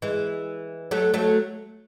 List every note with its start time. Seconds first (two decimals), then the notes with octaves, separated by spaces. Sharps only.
0.02 E3 G#3
0.91 F#3 A3
1.14 F#3 A3